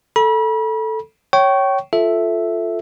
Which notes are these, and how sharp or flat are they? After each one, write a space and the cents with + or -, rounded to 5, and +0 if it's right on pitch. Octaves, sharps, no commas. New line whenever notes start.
A4 +0 B5 -40
C#5 +0 G5 -30 C#6 +0
F4 +0 A4 +0 E5 +0